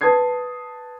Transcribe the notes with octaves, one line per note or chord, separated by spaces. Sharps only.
B4 A5 D#6 G#6 C7